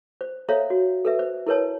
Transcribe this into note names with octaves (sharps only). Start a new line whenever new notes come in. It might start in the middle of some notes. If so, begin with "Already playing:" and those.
C5
A4 C5 C#5 E5 F5 A#5
F#4
A4 B4 E5
C5
E4 A#4 B4 C#5 A5